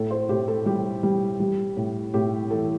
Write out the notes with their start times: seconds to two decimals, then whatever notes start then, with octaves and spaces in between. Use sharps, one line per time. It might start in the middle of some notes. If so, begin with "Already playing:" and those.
Already playing: A2 A4
0.11 C5
0.29 A2 G4
0.48 A4
0.66 G3 G4
1.03 G3
1.40 G3
1.76 A2
2.14 A2 G4
2.51 E3 A4